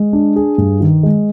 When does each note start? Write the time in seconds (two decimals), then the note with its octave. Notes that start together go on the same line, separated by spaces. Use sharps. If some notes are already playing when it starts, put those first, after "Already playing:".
Already playing: G#3
0.13 D4
0.36 G#4
0.58 G2
0.80 D#3
1.03 G#3